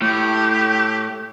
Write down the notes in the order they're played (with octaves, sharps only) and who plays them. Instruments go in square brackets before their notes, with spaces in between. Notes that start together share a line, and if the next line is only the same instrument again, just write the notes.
[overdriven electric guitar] A2 [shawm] G4